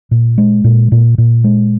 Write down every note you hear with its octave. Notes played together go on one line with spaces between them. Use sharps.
A#2
G#3
A#2
A#2
A#2
G#3